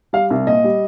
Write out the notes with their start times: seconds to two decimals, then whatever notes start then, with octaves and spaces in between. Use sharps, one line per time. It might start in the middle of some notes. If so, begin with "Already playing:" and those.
0.13 G3 F5
0.30 C2
0.47 A#2 D#5
0.64 G3